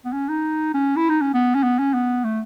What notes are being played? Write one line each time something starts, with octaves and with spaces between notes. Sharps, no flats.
B3
C#4
D#4
C#4
E4
D#4
C#4
B3
C#4
B3
C#4
B3
A3